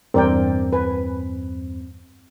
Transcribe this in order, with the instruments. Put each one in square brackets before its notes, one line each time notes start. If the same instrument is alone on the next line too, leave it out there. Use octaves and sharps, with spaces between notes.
[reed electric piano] E2 G2 C4 [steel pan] A#4 D5 G5
[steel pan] B4 G#5